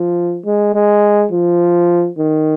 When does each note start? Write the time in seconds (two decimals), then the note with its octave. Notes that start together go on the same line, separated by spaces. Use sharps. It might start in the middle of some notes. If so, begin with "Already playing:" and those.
Already playing: F3
0.45 G#3
0.74 G#3
1.32 F3
2.18 D#3